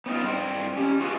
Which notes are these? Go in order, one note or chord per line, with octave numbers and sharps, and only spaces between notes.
B3 C4 D#4 F4
G2 C4 F4 G5
C#4 G4
F4 F#4 G#4 A4 B4 F5